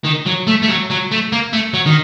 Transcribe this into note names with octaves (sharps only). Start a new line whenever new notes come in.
D#3
F#3
A3
A3
F#3
F#3
A3
A#3
A3
F#3
D#3